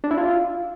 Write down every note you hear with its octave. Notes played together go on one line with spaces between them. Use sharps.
D4
E4
F4